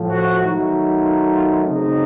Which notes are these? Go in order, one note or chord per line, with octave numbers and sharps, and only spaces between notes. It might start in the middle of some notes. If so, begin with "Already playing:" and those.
Already playing: A2 F3 A3
F#4
D#3 F#3 A3 D#4
F4
F4
C#3 F#3 A3 C4 D#4